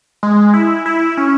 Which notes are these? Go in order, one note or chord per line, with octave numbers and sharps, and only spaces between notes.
G#3
E4
E4
C#4